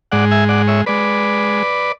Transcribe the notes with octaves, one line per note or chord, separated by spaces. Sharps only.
G#2 G#3 D5 F#5
E5 G#5
D5 F#5
C#5 E5
G#3 B4 D5